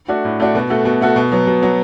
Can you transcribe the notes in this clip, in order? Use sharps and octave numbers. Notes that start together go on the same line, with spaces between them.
A3 D4 F#4
A2
A3 D4 F#4
B2
A3 F#4 A4
B2
A3 F#4 A4
B2
F#3 B3
B2
F#3 B3